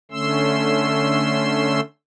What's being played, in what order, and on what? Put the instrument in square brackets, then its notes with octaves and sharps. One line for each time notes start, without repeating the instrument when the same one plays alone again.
[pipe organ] D3 A3 C#4 C6 E6